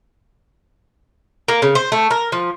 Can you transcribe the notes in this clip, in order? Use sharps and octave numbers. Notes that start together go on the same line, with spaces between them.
A#3
C#3
C5
A3
A#4
F3